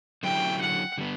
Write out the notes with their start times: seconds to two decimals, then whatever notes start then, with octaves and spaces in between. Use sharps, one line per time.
0.23 D3 F#3 C#4 E4 G4 G5
0.61 F#5
0.98 D3 G3 B3